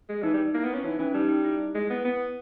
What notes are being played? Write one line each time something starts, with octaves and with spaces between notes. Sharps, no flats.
G#3
E3 D#4
G3
A#3 E4
B3
C#4
E3 D#4
E3 C#4
G3 D#4
D#4
E4
G#3
B3
B3